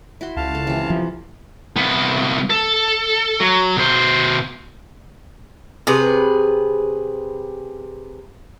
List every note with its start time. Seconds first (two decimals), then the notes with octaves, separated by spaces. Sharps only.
0.21 E4 F#4 C6
0.37 C#2 F5 A5
0.55 A4
0.67 C3 E3
0.90 F3
1.76 C2 B3
2.50 A4
3.40 F#3
3.77 B2 C5
5.87 C3 G#4 B4